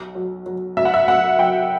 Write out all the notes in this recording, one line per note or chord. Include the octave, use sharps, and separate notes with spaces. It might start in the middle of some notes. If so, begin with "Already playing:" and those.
Already playing: B1
F#3
F#3
B1 E5
F#5
E5
B1 F#5
F#3 G5